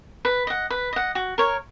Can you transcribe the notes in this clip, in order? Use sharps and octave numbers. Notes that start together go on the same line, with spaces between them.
B4
D#5 F#5
B4
D#5 F#5
F#4
A#4 C#5